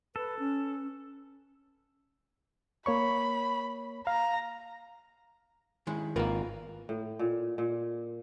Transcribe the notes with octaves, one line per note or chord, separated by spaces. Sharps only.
A4 B4
C#4
A#3 C#5 B5 C#6
F5 A#5
D#3 G#3 E4
G#1 A#3 F4 A#4 B4
A2
A#2
A#2